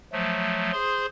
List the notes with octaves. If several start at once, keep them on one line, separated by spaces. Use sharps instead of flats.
F3 F#3 A3
G#4 C5 C6